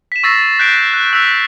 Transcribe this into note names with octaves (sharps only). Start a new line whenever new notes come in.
B6 E7
C#6 E6 A6 A#6 C7
F#6 G6 B6 C7 D7
F#6
E6 F#6 B6 F7